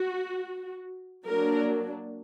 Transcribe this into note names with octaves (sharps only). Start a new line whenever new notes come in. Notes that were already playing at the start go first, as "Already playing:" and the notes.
Already playing: F#4
F#3 A#3 D4 A#4